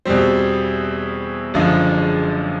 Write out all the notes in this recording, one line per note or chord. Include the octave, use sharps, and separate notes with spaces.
E2 B2 G3 C4
F#1 F#2 D3 F3 G#3